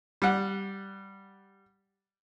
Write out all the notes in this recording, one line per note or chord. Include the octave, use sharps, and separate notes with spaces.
G3 F#5